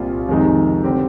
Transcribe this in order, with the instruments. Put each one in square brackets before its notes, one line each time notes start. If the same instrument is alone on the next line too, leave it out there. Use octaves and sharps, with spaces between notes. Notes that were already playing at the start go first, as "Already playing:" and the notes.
Already playing: [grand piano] C2 A#2 G3 C4 F4
F2 C3 D#3 G#3 D#4
D3 G3 C4 G4